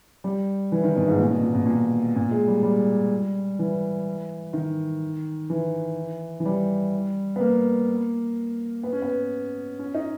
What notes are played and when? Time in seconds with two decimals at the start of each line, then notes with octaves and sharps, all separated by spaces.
0.24 G3
0.72 E3
0.84 D#3
0.96 B2
1.08 G#2
1.19 A#2
1.31 B2
1.42 A#2
1.55 B2
1.66 A#2
2.16 A#2
2.31 G#3
2.48 G3
2.63 G3
3.59 E3
4.53 D#3
5.50 E3
6.40 E3
6.45 G3
7.36 B3
7.40 A#3
8.83 B3
8.92 C#4
9.02 B3
9.79 C#4
9.95 D#4